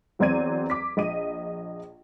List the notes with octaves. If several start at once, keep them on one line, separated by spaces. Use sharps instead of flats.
E2 F#3 C4 D5 G#6 D#7
D6 B6
A#1 D#5 D#7